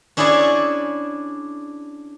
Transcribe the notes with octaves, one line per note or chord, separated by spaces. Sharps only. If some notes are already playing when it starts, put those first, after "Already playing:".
C#4 D4 E4 G#4 C#5 D5